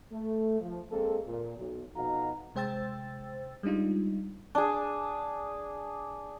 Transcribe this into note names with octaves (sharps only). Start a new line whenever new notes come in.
A3
F3
G#3 A#3 C4 G#4 A4
A#2
B1
F2 B2 D#4 F#4 F5 A#5
C3 G#3 C5 G5 E6 A6
G3 G#3 D4 D#4 F4
D4 G#4